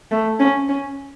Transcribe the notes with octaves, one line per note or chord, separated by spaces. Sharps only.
A3
C#4
C#4